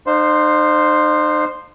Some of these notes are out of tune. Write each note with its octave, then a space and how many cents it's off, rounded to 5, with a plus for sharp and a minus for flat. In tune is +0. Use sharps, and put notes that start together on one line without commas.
D#4 -45 C5 +0 F5 +0